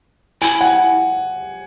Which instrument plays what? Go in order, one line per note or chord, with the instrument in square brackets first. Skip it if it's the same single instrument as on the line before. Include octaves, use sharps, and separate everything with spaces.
[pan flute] E4 [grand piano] G#5
[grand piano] F#5
G#5